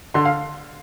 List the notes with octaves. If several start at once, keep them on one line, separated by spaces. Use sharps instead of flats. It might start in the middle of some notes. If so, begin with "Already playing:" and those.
D3 C6
F5